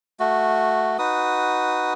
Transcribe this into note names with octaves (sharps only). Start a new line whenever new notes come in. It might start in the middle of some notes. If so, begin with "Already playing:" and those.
A3 F#4
D#4 F#4 B4 D#6